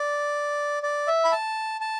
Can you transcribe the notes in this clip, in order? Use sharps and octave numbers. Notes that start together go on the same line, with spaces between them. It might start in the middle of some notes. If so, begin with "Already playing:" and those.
Already playing: D5
D5
E5
B5
A5
A5